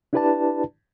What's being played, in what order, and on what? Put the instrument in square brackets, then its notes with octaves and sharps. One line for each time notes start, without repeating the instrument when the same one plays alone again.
[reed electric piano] D4 E4 G4 B4 D5 A5